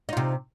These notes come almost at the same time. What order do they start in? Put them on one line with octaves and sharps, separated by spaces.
D#4 F4 C3